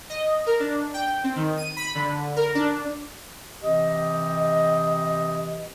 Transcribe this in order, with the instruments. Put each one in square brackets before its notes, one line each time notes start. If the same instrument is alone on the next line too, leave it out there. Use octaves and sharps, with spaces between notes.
[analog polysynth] D#5
A#4
D4
G5
C4
D#3
D#7
B5
D3
A#4
D4
[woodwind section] C3 E3 C4 G4 D#5